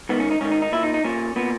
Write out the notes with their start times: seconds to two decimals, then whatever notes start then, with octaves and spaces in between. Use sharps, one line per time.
0.09 G#2 D#3 B3
0.20 C#4
0.31 D#4
0.41 G#2 D#3 C#4
0.52 D#4
0.62 D#4
0.72 A#2 E4
0.83 D#4
0.94 D#4
1.04 A#2 C#4
1.36 A#2 B3